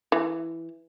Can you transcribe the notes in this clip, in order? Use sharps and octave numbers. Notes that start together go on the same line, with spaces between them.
E3